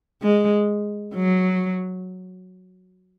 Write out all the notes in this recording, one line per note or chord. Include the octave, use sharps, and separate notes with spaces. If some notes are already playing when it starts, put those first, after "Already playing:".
G#3
F#3